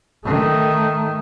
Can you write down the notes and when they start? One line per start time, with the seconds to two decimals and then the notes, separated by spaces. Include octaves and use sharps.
0.25 D#3 A3